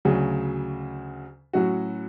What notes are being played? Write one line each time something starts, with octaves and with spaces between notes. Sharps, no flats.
D2 C#3 F#3
A2 F#3 C#4 F#4